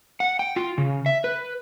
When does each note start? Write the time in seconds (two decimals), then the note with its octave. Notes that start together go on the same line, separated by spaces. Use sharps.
0.20 F#5
0.39 G5
0.56 F4
0.78 C#3
1.06 E5
1.24 B4